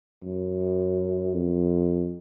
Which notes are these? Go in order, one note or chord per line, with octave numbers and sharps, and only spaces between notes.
F#2
F2